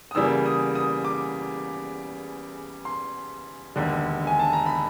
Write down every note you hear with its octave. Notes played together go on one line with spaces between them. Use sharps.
D#6
E2 C#3 E3 G3 A#3 E6
D#6
D#6
D6
C6
E1 D#2 D3
G#5
A5
A#5
B5